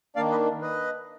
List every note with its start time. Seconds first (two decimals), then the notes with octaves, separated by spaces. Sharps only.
0.16 D#3 A#3 D4 D5 F5
0.31 B4 D#5
0.62 B4 D#5